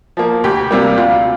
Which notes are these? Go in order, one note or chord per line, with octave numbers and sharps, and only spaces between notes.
F3 A#3
D2 G4
C3 G3 A#3
D2 F4